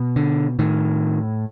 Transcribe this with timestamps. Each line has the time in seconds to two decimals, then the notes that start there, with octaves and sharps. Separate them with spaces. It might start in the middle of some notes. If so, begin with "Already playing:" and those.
Already playing: B2
0.16 D3
0.59 A2 D#3